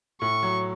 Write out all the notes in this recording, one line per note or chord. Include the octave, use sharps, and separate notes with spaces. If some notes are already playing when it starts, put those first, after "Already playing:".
A2 C#6
F#3